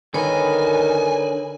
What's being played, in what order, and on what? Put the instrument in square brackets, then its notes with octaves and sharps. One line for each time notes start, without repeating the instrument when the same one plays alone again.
[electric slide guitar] D3 B4 [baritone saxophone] D#3 [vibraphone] A#4 C#5 [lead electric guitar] G#5